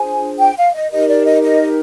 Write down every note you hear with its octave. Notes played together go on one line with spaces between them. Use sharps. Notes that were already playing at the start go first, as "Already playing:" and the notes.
Already playing: D4 F4 G#4 C5 G#5
G5
F5
D#5
D#4 G4 A#4 D#5
D5
D#5
D#5